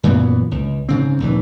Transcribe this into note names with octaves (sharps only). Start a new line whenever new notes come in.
F#2 A#2 E3 B3
C#2
G#2 C#3 C4
A#1 D#2 E3